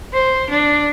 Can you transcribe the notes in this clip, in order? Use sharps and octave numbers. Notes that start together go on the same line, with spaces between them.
C5
D4